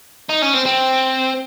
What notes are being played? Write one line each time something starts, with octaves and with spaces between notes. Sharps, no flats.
D#4
C#4
C4
C4